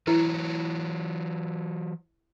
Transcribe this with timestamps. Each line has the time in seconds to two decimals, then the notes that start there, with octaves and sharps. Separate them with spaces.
0.07 E3 F#3 E4 B4 C#5